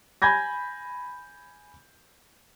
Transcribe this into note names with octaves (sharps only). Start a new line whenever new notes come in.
G#5 B5 G6 G#6 A#6